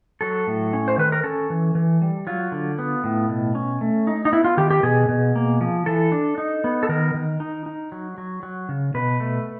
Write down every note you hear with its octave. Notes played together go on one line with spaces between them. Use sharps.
F#3 A4
A2
C#4
C5
D#3 B4
A#4
C#4 A4
E3
E3
G3
F#3 F4
D3
B3
A2
B2
C#4
A3
D#4
D#4
B3 E4
F4
D#3 G4
G4
B2 G#4
B2
A#3
F3
E3 A4
D4
D#4
B3
A4
D#3 A#4
D#3
D#4
D#4
F#3
F#3
F#3
C#3
B2 B4
A3